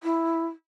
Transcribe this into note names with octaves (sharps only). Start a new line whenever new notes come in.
E4